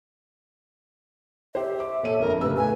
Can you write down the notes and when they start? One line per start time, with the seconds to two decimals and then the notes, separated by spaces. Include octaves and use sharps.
1.55 G4 C5 E5
1.80 D6
2.03 A#2 A4 C#5 D#7
2.19 G1 F2 A#4
2.41 A1 C#3 G4 B4 E6
2.56 A2 B4 G#5